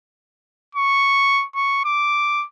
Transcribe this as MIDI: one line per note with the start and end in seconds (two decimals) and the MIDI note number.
0.75 1.45 85
1.55 1.82 85
1.85 2.46 86